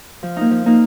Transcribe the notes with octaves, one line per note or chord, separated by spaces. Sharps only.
F3
A#3 D#4
F3
A#3 D#4